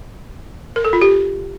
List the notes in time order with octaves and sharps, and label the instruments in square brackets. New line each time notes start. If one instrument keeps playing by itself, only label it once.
[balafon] A#4
A4
F4
G4